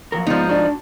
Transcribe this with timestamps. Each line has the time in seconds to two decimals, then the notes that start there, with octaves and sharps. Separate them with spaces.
0.12 F3 F#3 A#4
0.27 G#2 F3 B3 D#4 C#5 D5
0.49 D4 F#4 D5